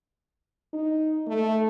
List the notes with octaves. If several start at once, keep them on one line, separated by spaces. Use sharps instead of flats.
D#4
A3